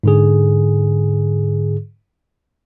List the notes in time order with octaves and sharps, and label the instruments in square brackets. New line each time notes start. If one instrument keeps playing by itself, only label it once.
[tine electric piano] G#2 D3 G#4